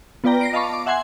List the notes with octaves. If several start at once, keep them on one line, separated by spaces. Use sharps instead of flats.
B3 F4 B4 D5 G5 A#5
A#6 C7 D7
D#5 F5 A5 B5 C#6 D6
D6
E5 F#5 G#5 C6 G#6